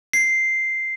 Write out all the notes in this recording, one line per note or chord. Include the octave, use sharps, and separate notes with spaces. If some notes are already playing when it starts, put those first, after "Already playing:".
C7